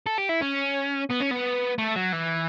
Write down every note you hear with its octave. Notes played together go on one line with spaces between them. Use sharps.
A4
G4
E4
C#4
B3
C#4
B3
A3
F#3
E3